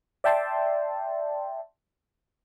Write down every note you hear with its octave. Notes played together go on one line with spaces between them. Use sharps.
D5 E5 G5 A5 C6